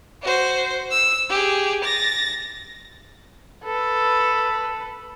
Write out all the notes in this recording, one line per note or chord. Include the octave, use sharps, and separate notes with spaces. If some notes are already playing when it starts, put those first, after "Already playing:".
F#4 C5
E6
G4 G#4
A6 A#6
A4 B4